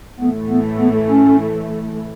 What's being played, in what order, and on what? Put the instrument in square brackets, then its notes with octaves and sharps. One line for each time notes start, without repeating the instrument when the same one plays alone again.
[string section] A2 E3 A3 [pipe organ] B3
[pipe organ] B3
B3
C#4